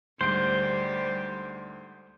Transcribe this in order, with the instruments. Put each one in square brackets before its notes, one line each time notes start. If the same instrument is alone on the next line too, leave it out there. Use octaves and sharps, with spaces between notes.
[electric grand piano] D2 G#2 D7 [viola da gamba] G3 [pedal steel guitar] C5